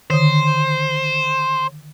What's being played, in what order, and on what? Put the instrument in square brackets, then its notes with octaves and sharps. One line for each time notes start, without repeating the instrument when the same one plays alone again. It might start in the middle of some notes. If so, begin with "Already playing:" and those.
[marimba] D3 D#3 [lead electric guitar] C5